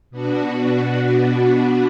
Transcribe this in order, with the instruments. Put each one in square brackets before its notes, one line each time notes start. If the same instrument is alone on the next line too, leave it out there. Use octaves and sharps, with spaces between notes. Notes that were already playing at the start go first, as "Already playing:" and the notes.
[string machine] B2 B3 D4 F#4